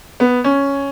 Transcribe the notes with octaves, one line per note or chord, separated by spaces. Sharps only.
B3
C#4